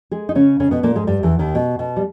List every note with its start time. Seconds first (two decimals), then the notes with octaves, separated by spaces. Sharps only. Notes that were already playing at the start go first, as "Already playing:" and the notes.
0.11 G#3 G#4
0.29 D#4
0.35 C#3 C#4
0.60 C#3 C#4
0.71 B2 B3
0.83 A#2 A#3
0.96 G#2 G#3
1.07 G2 G3
1.23 E2 E3
1.39 D#2 D#3
1.55 B2
1.79 B2
1.96 G3